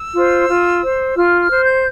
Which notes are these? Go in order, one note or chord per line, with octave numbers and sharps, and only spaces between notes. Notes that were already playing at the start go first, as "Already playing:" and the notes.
Already playing: E6
F4 C5
F4
C5
F4 F6
F6
C5
G6